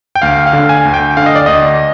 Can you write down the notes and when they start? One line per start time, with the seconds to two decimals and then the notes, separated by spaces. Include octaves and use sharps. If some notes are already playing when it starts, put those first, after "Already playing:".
0.15 G5
0.22 D2 F5
0.46 F5
0.53 D3
0.69 G#5
0.85 D2
0.94 G5
1.17 D3 F5
1.26 D#5
1.35 D5
1.46 D2 D#5